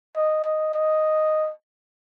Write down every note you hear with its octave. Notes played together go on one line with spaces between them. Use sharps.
D#5
D#5
D#5